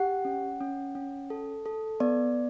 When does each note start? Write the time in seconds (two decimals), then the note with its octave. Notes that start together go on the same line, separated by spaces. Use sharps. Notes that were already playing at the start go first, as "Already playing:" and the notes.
Already playing: G4 F#5
0.25 C#4
0.61 C#4
0.95 C#4
1.30 A4
1.66 A4
2.00 B3 D5